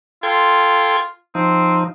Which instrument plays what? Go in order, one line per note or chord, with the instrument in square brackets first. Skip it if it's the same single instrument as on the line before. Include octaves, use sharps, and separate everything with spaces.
[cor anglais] F4 [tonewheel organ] A4 G5 G#6
[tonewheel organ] F3 D#4 [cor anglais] C4